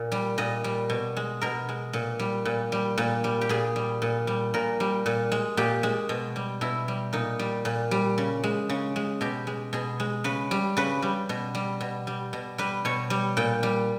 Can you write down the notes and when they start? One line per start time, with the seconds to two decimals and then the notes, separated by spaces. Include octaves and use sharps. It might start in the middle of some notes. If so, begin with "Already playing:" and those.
Already playing: A#2
0.12 G3
0.38 A#2 D#5
0.64 G3
0.90 B2
1.17 G#3
1.41 B2 A#4
1.69 G#3
1.93 A#2
2.19 G3
2.45 A#2
2.72 G3
2.98 A#2
3.24 G3
3.41 G4
3.49 A#2 G#4
3.76 G3
4.02 A#2
4.27 G3
4.54 A#2 A#4
4.80 G3
5.06 A#2
5.32 G#3
5.57 A#2 G4
5.83 G#3
6.09 B2
6.36 G3
6.61 B2 E4
6.88 G3
7.13 A#2 D#4
7.39 G3
7.65 A#2
7.91 G3
8.18 C#3
8.44 G#3
8.69 C#3
8.96 G#3
9.21 B2 G4
9.47 G#3
9.73 B2 G#4
10.00 G#3
10.24 C#3 B4
10.51 G3
10.77 C#3 B4
11.02 G3
11.29 B2
11.55 G3
11.81 B2
12.07 G3
12.33 B2
12.58 G3 B4
12.85 B2 C#5
13.10 G3
13.37 A#2 G5
13.63 G3